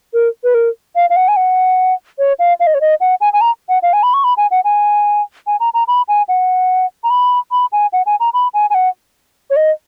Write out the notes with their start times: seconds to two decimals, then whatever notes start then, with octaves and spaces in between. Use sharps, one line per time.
0.13 A#4
0.44 B4
0.54 A#4
0.96 F5
1.10 F5
1.16 F#5
1.28 G#5
1.36 F#5
2.19 C#5
2.39 F5
2.60 F5
2.67 D#5
2.74 C#5
2.81 D#5
3.00 F#5
3.21 G#5
3.33 G#5
3.41 A#5
3.69 F#5
3.83 F5
3.93 G#5
4.03 B5
4.14 C#6
4.24 B5
4.37 G#5
4.51 F#5
4.64 G#5
5.47 G#5
5.60 A#5
5.74 A#5
5.88 B5
6.08 G#5
6.28 F#5
7.04 A#5
7.10 B5
7.51 B5
7.72 G#5
7.93 F#5
8.06 G#5
8.20 A#5
8.34 B5
8.54 G#5
8.70 G#5
8.74 F#5
9.50 C#5
9.56 D#5